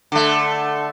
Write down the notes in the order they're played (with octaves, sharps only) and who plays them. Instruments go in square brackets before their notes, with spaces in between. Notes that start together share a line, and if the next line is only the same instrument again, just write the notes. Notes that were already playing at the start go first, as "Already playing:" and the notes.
[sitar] D3 A3